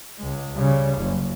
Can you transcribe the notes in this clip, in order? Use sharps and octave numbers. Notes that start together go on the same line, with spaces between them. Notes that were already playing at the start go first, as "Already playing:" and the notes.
C#2 G#3
C#3 G3
F#1